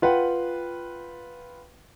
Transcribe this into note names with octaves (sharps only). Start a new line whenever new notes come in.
F4 B4 F#5 G5